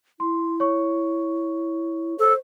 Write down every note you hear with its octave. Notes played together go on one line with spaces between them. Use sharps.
E4 C6
C#5 C#6
A4 C5